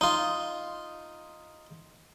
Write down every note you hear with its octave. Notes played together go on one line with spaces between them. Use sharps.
D#4 F4